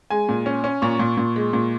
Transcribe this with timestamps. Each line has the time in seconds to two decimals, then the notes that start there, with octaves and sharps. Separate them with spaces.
0.10 G#3 G#5
0.29 A#2
0.46 C#4
0.64 C#4
0.82 A#2 C#6
0.99 A#2
1.17 A#2
1.36 G#3
1.53 A#2